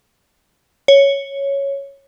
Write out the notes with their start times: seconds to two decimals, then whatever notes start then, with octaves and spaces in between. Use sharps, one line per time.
0.88 C#5